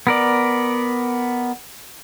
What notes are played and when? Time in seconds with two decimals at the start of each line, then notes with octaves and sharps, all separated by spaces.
0.07 B3 A#4 D5